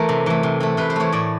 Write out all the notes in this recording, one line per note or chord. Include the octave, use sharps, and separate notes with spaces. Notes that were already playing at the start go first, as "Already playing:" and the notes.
Already playing: E3 A3 A#4
C3
E3 A3
C3
E3 A3
C3 B4
C5
E3 A3 C#5
A2 D5